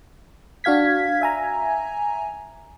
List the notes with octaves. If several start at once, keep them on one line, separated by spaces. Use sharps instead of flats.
D4 F#4 F5 G#6 B6
E5 G#5 A#5